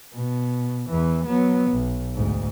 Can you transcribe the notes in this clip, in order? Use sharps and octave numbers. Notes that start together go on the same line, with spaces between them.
B2
E2 E3
F#3 B3
B1
D2 G#2